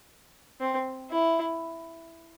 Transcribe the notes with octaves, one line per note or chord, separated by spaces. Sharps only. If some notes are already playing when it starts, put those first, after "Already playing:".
C4
E4